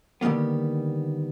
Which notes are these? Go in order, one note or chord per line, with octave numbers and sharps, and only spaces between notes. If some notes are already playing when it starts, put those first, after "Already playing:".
D3 D#3 G3 A#3 B3